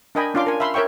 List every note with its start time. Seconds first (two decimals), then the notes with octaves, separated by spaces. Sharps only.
0.15 D4 A#4 D#5 G5 G#5 B5
0.34 C#4 D4 F4 F5 C6 D6
0.46 A#4 G#5
0.60 E5 F5 B5 C6
0.74 A#4 C#5 E5 G5 C#6